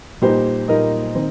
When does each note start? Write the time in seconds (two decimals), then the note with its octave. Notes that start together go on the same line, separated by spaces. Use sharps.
0.21 A#2 G3 A#3 D#4 G4 C5
0.68 A#2 G3 A#3 D#4 A#4 D#5
1.15 D#3 C4